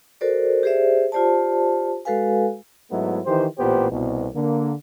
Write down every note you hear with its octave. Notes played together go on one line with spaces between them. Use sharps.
F#4 A4 A#4 C5 D5
G4 G#4 C5 D5 E5
F4 G4 C5 D5 A5
G#3 F#4 A4 B4 F5 G#5
G#2 F#3 A3 B3 D#4 E4
D#3 E3 G4 C5
A1 A#2 B3 G4 C5
C2 B2
D3 A#3